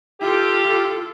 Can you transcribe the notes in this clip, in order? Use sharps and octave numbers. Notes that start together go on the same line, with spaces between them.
F4 G4 A4